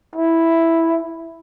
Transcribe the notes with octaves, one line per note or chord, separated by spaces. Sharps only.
E4